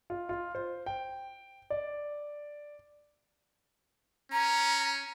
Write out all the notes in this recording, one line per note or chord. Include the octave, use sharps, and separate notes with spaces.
F4
F4
C5
G5
D5
C#4 A#5